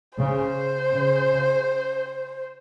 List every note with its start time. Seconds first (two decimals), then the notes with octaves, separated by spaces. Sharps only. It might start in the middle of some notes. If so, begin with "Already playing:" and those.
0.19 C#3 C5
0.93 C#3